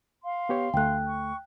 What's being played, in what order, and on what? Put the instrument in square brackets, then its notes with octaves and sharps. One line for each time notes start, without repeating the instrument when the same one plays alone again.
[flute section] F5 C6
[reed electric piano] B3 G4 C#5
[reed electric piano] D2 A3 [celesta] G5 F#6
[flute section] C#6